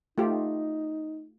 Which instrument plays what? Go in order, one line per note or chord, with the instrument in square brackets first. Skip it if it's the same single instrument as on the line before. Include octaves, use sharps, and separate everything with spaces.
[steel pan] A3 F4 G4 [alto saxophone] D#4